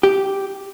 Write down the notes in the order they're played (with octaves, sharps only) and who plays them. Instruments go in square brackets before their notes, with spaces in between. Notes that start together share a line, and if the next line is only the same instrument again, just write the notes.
[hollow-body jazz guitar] G4